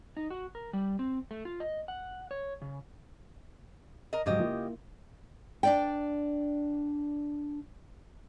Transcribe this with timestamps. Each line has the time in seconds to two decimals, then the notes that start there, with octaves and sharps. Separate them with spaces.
0.17 D#4
0.30 F#4
0.55 A#4
0.73 G3
0.99 C4
1.31 A3
1.45 F4
1.60 D#5
1.88 F#5
2.31 C#5
2.62 C#3
4.13 A#4 D#5
4.26 G#2 C#3 F#3 G4 D#5
4.39 A#3 E4 F4
5.63 D4 D5 G5